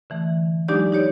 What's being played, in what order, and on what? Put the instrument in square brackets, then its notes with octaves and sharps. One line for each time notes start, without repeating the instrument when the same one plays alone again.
[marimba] D3 E3 A3
F#3 G#3 D4 D#4 G4 D5
D#4 G4 C#5 D5